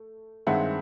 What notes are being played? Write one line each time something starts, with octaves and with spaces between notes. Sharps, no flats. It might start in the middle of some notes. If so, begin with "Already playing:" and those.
Already playing: A3
G2 D#3 G#3 C4 E5 F#5